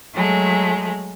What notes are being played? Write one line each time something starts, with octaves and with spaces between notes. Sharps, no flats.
F#3 G#3 A3